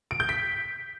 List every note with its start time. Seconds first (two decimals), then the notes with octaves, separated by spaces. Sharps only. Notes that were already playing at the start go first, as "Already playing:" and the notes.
0.11 D7
0.20 G6
0.29 B6